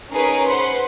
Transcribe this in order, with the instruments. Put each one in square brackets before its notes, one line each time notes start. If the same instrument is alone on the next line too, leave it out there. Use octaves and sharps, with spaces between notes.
[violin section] C#4 D#4 G#4 A#4 B4 C#5
B4 C5 F#5 B5 C6